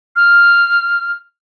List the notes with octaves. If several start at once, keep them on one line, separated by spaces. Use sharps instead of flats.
F6